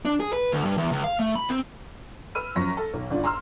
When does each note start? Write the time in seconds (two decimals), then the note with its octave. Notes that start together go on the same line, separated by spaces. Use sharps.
0.05 D4
0.20 G#4
0.33 B4
0.52 D2
0.65 G2
0.78 E2
0.92 C#2
1.04 F5
1.19 A3
1.35 B5
1.50 C4
2.35 B4 E6 F6 D#7
2.56 F#2 F3 C#6 A#6
2.77 A4
2.94 B1
3.10 G1 D4 F4
3.24 A#5 C6 E6 F6